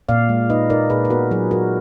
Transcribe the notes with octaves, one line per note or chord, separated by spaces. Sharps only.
A#2 D5 F5
G#3
D#4 B4 D#5
D#4 A#4 D5
A#2 G#4 B4
B4
B3 F#4 A#4
F#3 F4 G#4
F#3 F#4 A#4